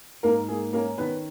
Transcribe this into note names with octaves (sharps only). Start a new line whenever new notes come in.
G#2 A#3 A#4
A#3 G#4
A#3 C#4 A#4
D#3 B3 B4